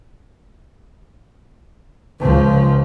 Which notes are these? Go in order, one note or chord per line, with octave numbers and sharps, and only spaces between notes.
C#2 F3